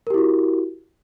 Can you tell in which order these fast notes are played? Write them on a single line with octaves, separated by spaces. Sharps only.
A#4 G4 E4 F#4